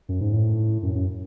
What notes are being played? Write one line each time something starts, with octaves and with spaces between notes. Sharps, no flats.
F#2
G#2
A2
F#2
F#2